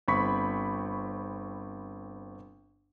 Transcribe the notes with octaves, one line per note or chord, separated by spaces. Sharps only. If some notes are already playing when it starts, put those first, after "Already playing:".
G1 C4 B5 C#6 B6